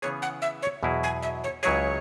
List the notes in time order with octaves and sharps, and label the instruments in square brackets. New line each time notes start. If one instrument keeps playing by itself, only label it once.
[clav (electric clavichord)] C#3 E3 B3 G#4 [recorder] C#5
[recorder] F#5
E5
C#5
[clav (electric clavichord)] E2 B2 F#3 E4 G#4
[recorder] G#5
E5
C#5
[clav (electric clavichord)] C#2 C#3 F#3 E4 G#4 [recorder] C#5